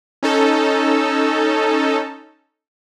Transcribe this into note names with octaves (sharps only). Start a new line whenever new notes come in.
C#4 D#4 A4